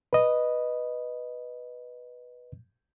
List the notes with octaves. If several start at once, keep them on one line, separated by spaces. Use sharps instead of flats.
B4 D#5